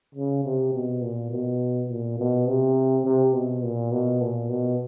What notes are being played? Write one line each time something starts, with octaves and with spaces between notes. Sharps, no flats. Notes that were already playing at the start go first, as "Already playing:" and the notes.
C#3
C3
B2
A#2
B2
A#2
B2
C3
C3
B2
A#2
B2
A#2
B2